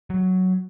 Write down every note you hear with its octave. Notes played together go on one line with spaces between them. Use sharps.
F#3